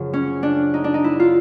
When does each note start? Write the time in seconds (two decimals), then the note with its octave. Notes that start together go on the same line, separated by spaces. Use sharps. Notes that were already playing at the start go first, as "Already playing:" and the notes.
Already playing: F#2 C#3 F3
0.13 C#4
0.43 D4
0.74 D#4
0.84 D4
0.94 D#4
1.04 E4
1.19 F4